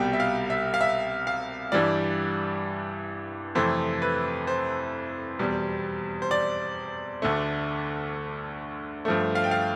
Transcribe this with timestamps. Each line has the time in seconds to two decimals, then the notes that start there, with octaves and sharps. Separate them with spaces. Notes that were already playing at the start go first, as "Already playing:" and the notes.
Already playing: C2 B2 G3 G5
0.13 E5
0.20 F5
0.50 E5
0.74 F5
0.81 E5
1.27 F5
1.72 G2 E3 G3 D5
3.55 F2 C3 E3 A3 C5
4.02 B4
4.47 C5
5.39 E2 B2 G3
6.22 C5
6.31 D5
7.22 D2 D3 A3
9.05 G2 F3 A3
9.35 F5
9.44 G5
9.51 F5